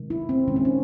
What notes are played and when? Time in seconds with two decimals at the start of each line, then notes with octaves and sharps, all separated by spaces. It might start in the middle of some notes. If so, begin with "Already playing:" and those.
Already playing: C3 D#3 G#3
0.10 E4
0.29 C4
0.47 D#3 G#3 C#4
0.56 C4
0.65 C#4